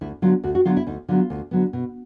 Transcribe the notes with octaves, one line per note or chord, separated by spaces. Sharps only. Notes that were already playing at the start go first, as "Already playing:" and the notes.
D2 E4
D3 F#3 B3 F4
D2 F#4
F#4
D3 F#3 B3 F4
E4
D2 D#4
D3 F#3 B3 F4
D2
D3 F#3 B3
B2